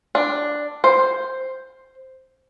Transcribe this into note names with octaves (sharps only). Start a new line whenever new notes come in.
D4
C5